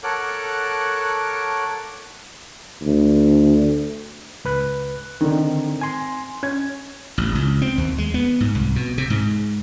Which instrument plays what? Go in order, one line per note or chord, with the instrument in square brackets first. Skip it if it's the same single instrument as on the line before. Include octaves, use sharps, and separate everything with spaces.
[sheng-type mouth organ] A4 A#4 C#5 F#5 D6 F#6
[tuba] D2
[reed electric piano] C#2 B4 F#6
[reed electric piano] D3 D#3 [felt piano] C4 D#4
[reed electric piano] G#5 C6
[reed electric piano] C#4 [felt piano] G#6
[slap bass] A1
C#2
C4
D#2
G#3
B3
G#2
C2
B2
C3
G#2